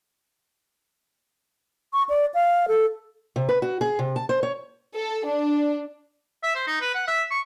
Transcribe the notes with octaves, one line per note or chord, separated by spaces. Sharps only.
C#6
D5
F5
A4
C3
B4
F#4
G#4
C3
A5
C5
C#5
A4
D4
E5
C5
D#4
B4
F#5
E5
C#6